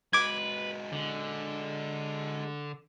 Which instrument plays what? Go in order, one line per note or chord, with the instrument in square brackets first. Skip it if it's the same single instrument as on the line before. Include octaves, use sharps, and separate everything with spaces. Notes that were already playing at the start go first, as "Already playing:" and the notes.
[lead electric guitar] G#3 F#4 [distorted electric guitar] B4 [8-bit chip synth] D6 G#6
[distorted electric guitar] D3